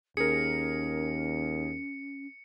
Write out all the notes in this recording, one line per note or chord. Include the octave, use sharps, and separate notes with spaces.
D#2 C#4 G#4 A#4 C#7